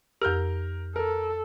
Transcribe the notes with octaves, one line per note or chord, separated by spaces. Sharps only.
F2 G4 A#4 F6 G6
A4 A#4